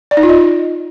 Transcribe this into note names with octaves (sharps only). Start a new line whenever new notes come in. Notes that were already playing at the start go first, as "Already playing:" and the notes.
D5
D#4
F4
D#5